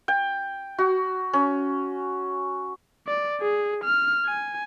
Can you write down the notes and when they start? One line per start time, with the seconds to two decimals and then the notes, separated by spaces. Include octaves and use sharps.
0.08 G5
0.78 F#4
1.33 C#4
3.07 D5
3.41 G#4
3.84 F6
4.26 G#5